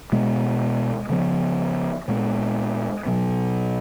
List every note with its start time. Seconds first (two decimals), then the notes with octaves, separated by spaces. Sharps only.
0.12 B2 G#3 B3
1.09 C#3 F3 B3
2.08 A#2 G#3 B3
3.06 B2 F#3 B3